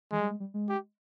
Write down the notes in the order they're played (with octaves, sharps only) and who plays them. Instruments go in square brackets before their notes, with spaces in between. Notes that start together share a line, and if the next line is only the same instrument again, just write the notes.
[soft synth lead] E3 [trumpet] G#3
[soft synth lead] G3
G#3
G3
G#3
[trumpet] G4